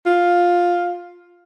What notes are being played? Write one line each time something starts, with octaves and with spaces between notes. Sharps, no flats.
F4